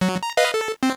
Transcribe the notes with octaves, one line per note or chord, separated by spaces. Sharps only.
F#3
A#5
B4 D#5 F5
A4
C4